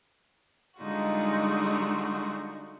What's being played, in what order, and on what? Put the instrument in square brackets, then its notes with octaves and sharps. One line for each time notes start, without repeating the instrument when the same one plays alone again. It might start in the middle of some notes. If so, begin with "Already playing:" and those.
[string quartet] D3 G3 G#3 D#4 F4 F#4